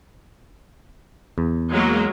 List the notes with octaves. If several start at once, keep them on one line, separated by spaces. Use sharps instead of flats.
E2
F#3 G#3 A#3